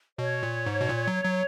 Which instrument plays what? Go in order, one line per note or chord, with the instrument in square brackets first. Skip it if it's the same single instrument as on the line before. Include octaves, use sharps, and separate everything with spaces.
[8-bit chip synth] B2 [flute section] C#5
[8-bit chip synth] A#2
G#2
B2
A#2
F#3
F#3